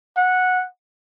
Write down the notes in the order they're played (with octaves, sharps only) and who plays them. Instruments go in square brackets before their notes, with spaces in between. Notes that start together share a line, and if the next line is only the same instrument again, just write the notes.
[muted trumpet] F#5